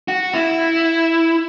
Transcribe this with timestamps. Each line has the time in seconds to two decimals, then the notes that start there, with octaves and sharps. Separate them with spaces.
0.08 F#4
0.34 E4